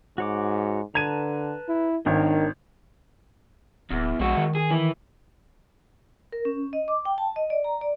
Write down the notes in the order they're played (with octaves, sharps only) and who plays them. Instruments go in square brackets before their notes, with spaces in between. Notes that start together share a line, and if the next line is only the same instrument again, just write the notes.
[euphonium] G#2 [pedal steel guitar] F#4 C#5 D6
[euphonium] D3 [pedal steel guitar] B4 A5 A#5 [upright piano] G#6 D#7
[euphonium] E4
[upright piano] G#1 [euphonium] D#3 [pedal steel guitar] D4 A#4 C#5
[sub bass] D1 [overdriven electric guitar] E2
[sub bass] A#1 [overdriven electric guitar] G#3 F#4
[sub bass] D#3
[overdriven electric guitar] G#4
E3
[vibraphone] A#4
C#4
D#5
D6
G5
A5
D#5
D5
A#5
D5